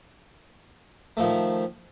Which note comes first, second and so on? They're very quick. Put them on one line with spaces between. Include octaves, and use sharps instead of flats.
A3 F3 D#3